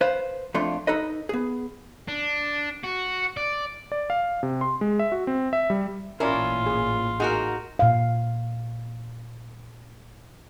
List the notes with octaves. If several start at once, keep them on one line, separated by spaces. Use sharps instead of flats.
B4 C5 F5
F2 A3 D4 F4 C6
D#4 A4 B4 D#5
B3 G#4
D4
F#4
D5
D5
F5
C3
C6
G#3
E5
F#4
C4
E5
G3
A1 A#2 C#4 E4 F4 A#4 D5
G#4
D#4 F#4 G#4 A#4 F#5
A#2 F5